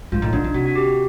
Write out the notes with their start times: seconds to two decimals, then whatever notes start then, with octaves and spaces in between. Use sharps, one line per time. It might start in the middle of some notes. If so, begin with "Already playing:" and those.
0.12 G#2 F4
0.22 A2 D#4
0.33 D3 D4
0.44 C#3 D4
0.54 C3 F#4
0.66 F#4
0.75 G4